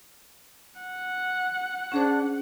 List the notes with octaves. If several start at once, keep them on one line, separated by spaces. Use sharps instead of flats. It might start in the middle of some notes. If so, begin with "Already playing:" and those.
F#5
C#4 D4 G#4 C5